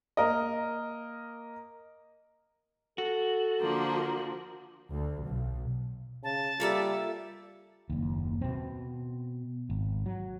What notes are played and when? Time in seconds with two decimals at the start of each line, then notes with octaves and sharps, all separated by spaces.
0.17 A#3 A#4 D#5
2.98 F#4 A4
3.61 D3 F3 A#3
4.91 D2
5.25 B1
6.24 C#3 A5
6.60 G3 A#3 F4 A4 E5
7.90 F#1 D#2
8.41 B2 C4
9.70 G#1
10.06 F#3